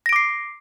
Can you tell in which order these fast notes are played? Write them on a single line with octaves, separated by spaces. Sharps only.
A#6 D7 D6 C7